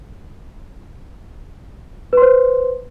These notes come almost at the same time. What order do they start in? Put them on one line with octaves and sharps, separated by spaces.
B4 C6 C5